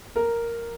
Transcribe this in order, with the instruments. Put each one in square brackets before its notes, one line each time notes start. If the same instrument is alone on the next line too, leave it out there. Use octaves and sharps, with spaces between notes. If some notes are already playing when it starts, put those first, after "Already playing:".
[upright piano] A#4